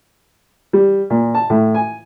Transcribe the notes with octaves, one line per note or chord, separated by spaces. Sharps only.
G3
A#2
A5
A2
G#5